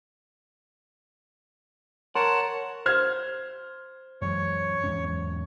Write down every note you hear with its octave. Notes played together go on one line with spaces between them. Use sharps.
A#4 C#5 F#5 A5 C6
C5 F6 G#6
F#2 E3 G#3 C#5
E2 G#2 C#4